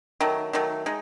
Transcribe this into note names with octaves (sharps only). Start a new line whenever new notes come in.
D#3 F#3 A3
D#3 F#3 A3
G#3 D#4